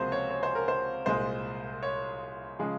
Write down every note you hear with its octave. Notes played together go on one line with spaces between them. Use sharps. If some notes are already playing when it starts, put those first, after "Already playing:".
Already playing: C#2 C3 F3 A#3 F#4 G#4 C5
C#5
C#5
C5
A#4
C5
C2 A#2 G#3 C5
C#5
C#3 F3 G#3